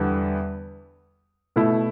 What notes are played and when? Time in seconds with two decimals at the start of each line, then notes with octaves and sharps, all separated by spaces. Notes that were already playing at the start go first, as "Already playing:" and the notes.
Already playing: E2 D3 G3 B3
1.56 B2 A3 E4